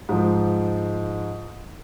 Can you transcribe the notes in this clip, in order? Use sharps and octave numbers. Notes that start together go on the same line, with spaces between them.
G#2 F3